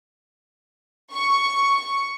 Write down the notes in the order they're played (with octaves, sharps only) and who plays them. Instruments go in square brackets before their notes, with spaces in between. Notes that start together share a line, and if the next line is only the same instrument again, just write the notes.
[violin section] C#6